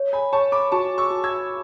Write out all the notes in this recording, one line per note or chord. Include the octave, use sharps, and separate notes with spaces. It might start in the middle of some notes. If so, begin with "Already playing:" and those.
Already playing: C#5
G#5 B5
C#5 A5 C#6
B5 D6
F#4 A5 C#6
C#6 E6
F#4
E6 G#6